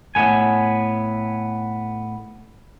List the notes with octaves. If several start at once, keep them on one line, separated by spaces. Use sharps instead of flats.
A2 B3 G#5